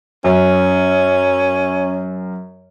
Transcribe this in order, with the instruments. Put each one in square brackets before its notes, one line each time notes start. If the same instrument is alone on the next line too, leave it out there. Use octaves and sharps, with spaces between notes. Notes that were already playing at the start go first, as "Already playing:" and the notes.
[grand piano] F#2 [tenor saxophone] C#4